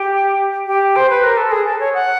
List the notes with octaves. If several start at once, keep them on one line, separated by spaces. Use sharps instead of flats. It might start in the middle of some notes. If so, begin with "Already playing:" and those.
Already playing: G4
G4
C5
B4
A#4
A4
G#4
A4
C#5
F#5